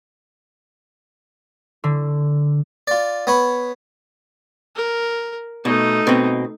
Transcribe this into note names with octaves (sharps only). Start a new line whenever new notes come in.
D3
F4 D5
B3 C#5 B5
A#4
B2 A3 D#4
B2 C4